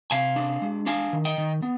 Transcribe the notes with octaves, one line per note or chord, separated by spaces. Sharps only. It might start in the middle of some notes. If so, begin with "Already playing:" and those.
C3 F5 G#5
D4
G#3
D4 F5 G#5
D#3
D#5 G5
D#3
B3